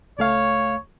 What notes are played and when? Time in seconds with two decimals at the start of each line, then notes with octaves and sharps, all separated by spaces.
0.19 C#2 A3 C#5 F5